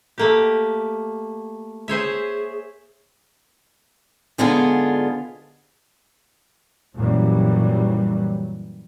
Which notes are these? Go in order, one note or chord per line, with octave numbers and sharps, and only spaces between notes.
A3 A#3 G4
G#4 C5 C#5 E5
G#2 D3 B3 F4 G#4
F#2 A#2 E3 F#3 G3